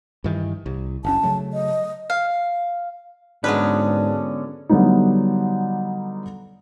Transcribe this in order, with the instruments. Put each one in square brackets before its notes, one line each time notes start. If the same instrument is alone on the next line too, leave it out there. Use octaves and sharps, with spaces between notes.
[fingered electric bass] G2 D#3 E3
C2
[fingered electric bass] F#1 D3 C#4 [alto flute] A5
[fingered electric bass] C#3 F#3 A3
[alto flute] D#5
[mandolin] F5
[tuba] G#2 [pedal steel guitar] D3 B3 C#4 [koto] F#3 G#3 B4 [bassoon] D4
[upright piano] D3 F#3 G3 B3 D#4